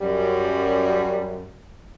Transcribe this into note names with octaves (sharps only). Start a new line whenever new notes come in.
F#2 G3